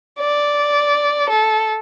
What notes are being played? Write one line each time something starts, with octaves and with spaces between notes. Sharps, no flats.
D5
A4